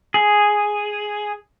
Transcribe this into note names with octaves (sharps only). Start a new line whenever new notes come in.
G#4